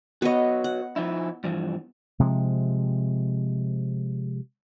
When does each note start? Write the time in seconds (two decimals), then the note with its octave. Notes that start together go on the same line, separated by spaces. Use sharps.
0.22 B3 F#4 B4 C#5 D#5
0.64 F#5
0.96 F3 D#4 E4
1.44 G2 E3 F3
2.20 C3 F3 G#3